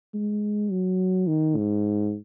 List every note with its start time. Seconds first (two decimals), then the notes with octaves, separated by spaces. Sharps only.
0.14 G#3
0.71 F#3
1.27 D#3
1.57 G#2